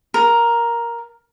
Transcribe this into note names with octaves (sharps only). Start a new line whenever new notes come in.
A#4